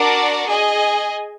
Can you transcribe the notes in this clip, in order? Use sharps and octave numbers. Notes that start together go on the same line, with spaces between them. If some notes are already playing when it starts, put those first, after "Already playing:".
Already playing: D4 F#4 A#4 D5 F#5
G#4 D#5 G#5